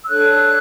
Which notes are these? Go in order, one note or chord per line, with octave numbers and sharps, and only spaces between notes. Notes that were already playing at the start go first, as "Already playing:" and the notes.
E6
D4 A4 C#5 F#6